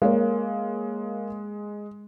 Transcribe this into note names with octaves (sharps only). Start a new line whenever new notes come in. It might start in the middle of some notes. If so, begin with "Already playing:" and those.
G#3 A#3 A#4 C#5